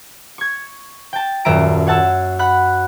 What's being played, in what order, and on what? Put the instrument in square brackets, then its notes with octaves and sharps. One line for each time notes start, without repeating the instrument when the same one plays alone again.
[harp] C#6 G#6
G5 A5
D#1 F#2 E5 A#5 D7
C#5 F#5 A5 E6
F#5 B5 F#6